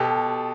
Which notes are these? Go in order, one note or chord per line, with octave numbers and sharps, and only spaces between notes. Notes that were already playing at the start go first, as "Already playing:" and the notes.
Already playing: B2 G4 A4